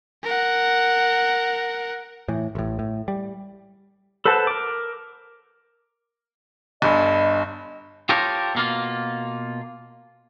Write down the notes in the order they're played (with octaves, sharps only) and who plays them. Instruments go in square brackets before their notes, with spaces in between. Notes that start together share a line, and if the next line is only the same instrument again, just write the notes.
[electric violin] A#4 F#5
[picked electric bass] A2 E3
A1 A2
A2
G3
[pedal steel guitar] A4 B4 C5 F#5 A5
A#4 D6
[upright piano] G1 G2 [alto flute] D#5
[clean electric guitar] F4 G4 A4 A#4 C5 C#5
B2 A#3 F4